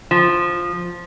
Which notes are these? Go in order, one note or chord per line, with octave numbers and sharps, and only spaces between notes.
F3